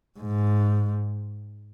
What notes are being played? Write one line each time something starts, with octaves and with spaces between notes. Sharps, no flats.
G#2